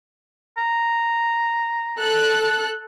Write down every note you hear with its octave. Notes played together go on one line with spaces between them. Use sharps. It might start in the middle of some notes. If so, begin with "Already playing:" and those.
A#5
A4 F#6